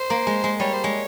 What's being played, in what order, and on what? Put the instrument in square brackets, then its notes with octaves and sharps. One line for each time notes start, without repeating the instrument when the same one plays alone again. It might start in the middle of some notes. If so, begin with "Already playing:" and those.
Already playing: [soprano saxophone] C5
[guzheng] A#3
G#3
G#3
[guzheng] G3 [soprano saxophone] C#5
[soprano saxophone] C5
[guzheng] G#3 [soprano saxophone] C#5